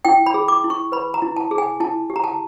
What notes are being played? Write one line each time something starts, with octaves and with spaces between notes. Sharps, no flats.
E4 G5
B5
G#4
D6
E4
C#6
B4 B5
A#5
E4
A5
G#4
G#5
E4 A5
G4
A#5
A5